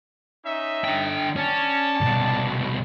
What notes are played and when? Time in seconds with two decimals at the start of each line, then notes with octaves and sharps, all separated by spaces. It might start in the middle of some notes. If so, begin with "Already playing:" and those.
0.46 C#4 D#4 E5
0.85 D3 G5
1.36 C#4 D5 A5
2.01 C2 B2